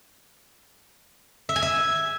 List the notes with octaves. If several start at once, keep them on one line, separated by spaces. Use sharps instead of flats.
E5
G#5
E5